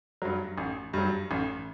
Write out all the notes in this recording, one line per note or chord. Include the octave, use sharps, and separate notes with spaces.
G2 F#3
A1
G2 F#3
A1